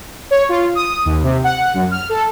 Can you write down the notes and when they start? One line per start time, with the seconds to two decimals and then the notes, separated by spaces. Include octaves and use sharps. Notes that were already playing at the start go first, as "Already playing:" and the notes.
0.31 C#5
0.49 F4
0.75 D#6
1.05 D#2
1.23 C3
1.44 F#5
1.74 F#2
1.91 F6
2.09 A4